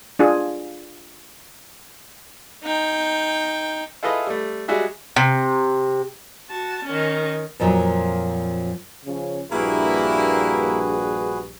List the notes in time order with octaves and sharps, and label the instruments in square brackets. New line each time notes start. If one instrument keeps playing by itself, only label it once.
[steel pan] D4 F4 G#4
[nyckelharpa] D#4 G5
[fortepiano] E4 F4 G#4 A4 B4 D#5
G3 A3
G3 G#3 F#4 G#4 E5
[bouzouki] C3
[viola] F#4 A5
D#3 C#4
[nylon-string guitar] F2 A#2 F3 F#3
[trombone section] C#3 F3 C#4
[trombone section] A#1 G2 [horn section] A#3 E4 [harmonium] F#4 G#4 B4